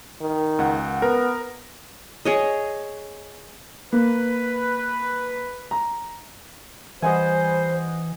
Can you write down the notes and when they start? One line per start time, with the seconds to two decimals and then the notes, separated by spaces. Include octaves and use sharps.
0.21 D#3
0.59 C#2 F#5
1.02 B3 A#4
2.25 G#4 C#5 D#5
3.92 A#3 B4
5.71 A#5
7.02 E3 G3 C5 D#5 F#5 G#5